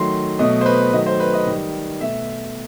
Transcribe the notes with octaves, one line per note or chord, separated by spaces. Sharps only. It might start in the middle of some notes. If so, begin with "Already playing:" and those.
Already playing: D#3 F#3 A3 C6
B2 F#3 A3 D#5
C5
B4
D#3 F#3 A3 D#5
C5
B4
D#5
D#3 G3
B2 A3 E5